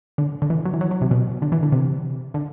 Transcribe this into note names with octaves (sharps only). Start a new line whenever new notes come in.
D3
D3
E3
F#3
E3
F#3
F#3
C3
B2
D3
E3
D3
C3
D3